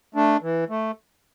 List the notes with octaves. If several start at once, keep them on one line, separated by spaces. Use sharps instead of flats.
A3 D4
E3
A3